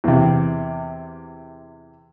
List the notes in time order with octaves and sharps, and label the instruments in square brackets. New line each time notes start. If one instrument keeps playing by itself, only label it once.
[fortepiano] E2 C3